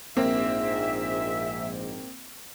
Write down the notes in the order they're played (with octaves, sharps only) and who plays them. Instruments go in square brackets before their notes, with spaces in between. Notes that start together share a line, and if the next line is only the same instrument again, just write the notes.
[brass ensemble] A#1 G#2 [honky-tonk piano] A#3 C4 [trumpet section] E5